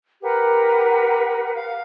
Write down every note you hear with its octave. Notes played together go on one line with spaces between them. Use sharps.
G4 A#4 B4 F#5
F5